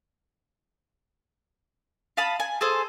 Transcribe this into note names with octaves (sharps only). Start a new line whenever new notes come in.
F5 A5 B5 D#6
G#5
G#4 A4 C5